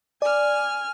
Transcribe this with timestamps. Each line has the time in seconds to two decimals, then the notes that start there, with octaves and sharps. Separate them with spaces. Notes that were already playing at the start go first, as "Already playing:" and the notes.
0.22 D5 G#5 F6